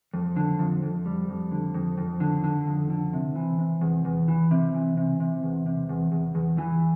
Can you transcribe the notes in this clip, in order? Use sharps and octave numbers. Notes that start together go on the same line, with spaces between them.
F2
D3
F2
F2
G3
F2
D3
F2
F2
D3
D3
F2
D3
C3
E3
C3
E2
E2
E3
C3
E3
C3
C3
E2
C3
E2
E2
E2
E3